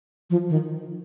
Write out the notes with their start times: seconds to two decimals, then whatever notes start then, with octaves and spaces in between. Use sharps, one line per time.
0.30 F3
0.49 D#3